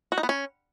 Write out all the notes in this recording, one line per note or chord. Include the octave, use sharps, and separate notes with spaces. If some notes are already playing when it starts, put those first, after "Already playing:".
F#4
D#4
B3
C#4